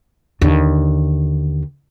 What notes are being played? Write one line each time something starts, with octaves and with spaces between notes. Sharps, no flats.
D#2 D3